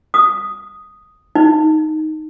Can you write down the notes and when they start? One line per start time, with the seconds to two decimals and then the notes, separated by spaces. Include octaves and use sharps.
0.14 D#6
1.35 D#4